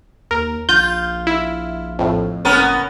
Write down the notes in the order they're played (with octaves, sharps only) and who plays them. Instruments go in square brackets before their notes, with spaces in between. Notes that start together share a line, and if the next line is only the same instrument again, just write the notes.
[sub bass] D#2 [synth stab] A#4
[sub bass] A#1 [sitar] F4 [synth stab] G6
[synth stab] E4
F2 A2
[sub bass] F#1 [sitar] B3 C#4 A#4